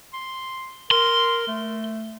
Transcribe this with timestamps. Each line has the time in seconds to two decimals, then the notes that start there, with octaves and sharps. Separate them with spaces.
0.13 C6
0.91 A#4 C6
1.48 A3